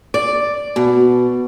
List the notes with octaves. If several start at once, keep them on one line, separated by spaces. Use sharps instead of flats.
D5
B2